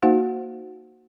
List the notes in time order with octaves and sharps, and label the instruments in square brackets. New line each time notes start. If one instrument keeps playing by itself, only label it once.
[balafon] A#3 D#4 F#4 C5 F5 F#5